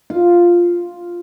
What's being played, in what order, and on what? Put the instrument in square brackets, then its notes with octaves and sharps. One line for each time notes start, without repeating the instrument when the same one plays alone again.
[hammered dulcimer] F4